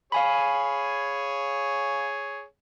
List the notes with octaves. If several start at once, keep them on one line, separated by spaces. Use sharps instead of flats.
G#4 C#5 F5 G#5 B5